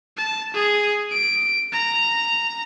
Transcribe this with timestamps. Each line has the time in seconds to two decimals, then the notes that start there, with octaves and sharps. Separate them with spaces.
0.17 A5
0.54 G#4
1.11 D7
1.72 A#5